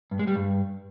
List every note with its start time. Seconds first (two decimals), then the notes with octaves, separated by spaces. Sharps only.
0.11 G2
0.19 G#3
0.27 G3
0.35 G2